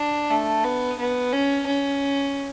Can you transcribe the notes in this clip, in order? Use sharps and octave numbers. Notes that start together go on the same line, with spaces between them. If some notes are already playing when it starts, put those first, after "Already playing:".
Already playing: D4
A3
B3
B3
C#4
C#4